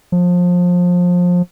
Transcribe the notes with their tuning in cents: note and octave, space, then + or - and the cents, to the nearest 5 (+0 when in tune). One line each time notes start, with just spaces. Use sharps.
F3 +25